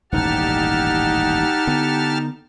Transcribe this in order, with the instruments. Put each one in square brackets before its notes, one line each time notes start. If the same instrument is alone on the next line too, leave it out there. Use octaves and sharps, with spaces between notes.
[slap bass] D#1 A1 G#2 [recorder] D#4 [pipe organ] G4 A5 F6 [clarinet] F#5
[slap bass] D3 B3